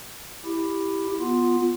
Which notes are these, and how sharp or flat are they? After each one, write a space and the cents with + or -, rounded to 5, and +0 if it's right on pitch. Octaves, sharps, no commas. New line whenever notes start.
E4 +0 G4 +5
B3 -10 F4 +0